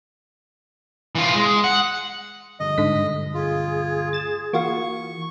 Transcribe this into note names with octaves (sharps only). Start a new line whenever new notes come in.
E3 F4
G#3
F#5
D2 G2 D#5
G#2 D3 B6
F4 G#4
A6 E7
E3 A#3 F4 F#4 C#6